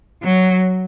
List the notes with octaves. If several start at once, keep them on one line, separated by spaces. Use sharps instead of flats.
F#3